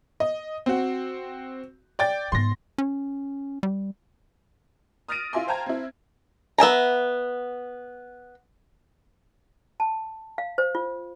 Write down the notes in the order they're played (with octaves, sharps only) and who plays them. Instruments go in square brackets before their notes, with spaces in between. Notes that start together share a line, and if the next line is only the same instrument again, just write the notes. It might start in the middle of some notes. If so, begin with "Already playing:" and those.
[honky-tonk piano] D#5
C4 F#4
D5 G5 A6
[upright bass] G#2 B3 [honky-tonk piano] C6 A#6
[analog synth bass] C#4
G3
[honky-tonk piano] D#6 F6 A6 A#6 D7 D#7
E4 F4 E5 G#5 C6
C5 F5 G5 A5 A#5 G#6
C4 E4
[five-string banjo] B3 E5 G#5 A#5
[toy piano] A5
F5
C5
F4